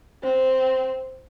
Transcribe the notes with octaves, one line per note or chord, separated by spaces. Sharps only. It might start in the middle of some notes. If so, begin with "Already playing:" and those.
C4 C5